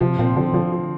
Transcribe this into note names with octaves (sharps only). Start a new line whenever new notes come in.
C3 F3
A#2 C4
D3 F3
D3 F3
F3